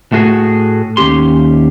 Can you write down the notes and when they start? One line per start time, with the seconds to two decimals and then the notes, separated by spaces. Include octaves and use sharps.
0.12 A2 A3 F#4 G#4
0.97 D#2 C#4 G4 C6